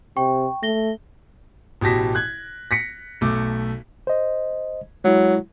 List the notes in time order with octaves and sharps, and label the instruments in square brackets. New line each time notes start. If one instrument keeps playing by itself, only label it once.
[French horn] C3 [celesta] G5 C#6
[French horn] A3 [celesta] A#6 G7
[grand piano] A1 B2 G4 A5 A#6 B6
F#6 G#6
A#6 B6 C#7
B1 A3 D6
[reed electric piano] C5 D#5
[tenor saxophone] F#3 [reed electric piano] G#3 E4